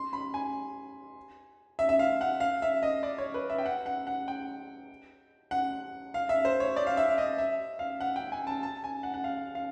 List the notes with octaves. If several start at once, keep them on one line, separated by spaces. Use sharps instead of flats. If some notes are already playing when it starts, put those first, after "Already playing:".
Already playing: C6
B5
G#5
E5
E5
F5
F#5
F5
E5
D#5
D5
C#5
B4
E5
G5
F#5
F#5
F#5
G5
F#5
F5
E5
C5
C#5
D5
F5
E5
D#5
E5
F5
F#5
G5
G#5
A5
A5
G#5
F#5
F#5
F5
F5